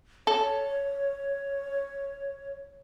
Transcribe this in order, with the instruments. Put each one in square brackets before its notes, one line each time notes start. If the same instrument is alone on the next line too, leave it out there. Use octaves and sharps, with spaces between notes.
[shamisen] A4 [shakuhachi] C#5